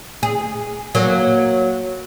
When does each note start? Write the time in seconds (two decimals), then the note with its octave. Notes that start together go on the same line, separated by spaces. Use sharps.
0.23 G#4
0.95 F#3 A#3